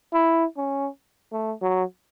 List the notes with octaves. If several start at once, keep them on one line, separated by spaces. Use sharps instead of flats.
E4
C#4
A3
F#3